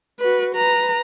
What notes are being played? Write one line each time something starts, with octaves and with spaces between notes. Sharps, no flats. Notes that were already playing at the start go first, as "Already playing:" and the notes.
F#4 B4
B4 A#5